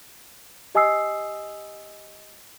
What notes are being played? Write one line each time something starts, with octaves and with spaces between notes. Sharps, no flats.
G4 D#5 G#5 D#6 E6 C7